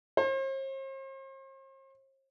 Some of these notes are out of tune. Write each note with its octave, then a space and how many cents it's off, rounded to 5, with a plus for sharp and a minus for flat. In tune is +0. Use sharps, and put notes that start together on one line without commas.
C5 +45